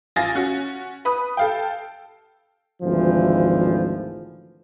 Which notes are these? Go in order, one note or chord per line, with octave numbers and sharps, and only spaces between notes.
A1 F4 G#5 A6 A#6
C#4 F#4
B4 B5 D#6
A4 F5 G5
G#1 D2 E3 F3